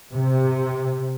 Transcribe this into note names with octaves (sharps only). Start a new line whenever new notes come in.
C3